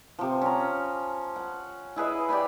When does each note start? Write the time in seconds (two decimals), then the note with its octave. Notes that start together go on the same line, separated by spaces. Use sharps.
0.19 C3 F3
0.41 C#4 A#5
1.36 F#5
1.96 E4 G#4 B4 D#5
2.29 G4 D5 G#5 B5